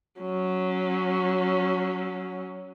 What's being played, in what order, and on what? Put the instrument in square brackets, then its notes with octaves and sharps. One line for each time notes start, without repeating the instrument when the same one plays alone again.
[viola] F#3 C#4